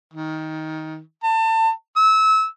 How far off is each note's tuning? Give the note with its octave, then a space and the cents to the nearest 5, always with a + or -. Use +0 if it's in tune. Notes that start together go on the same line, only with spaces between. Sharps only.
D#3 +15
A5 +30
E6 -25